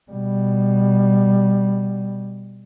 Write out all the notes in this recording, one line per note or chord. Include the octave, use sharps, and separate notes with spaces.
B2 G3